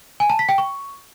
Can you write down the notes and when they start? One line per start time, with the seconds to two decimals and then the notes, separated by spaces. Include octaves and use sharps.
0.20 G#5
0.30 A5
0.39 B6
0.49 G5
0.58 C#6